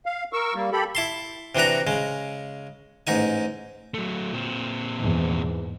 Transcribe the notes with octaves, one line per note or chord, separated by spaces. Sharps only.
F5
A#4 C#6 E6
G3 A#3
G4 A4 B5
E4 A5 C6
C3 E3 D4 F#4 A#5
C#3 G#3
A1 G#2 D#4 G#5
F#3 A3
A#2 C4
E2 G#2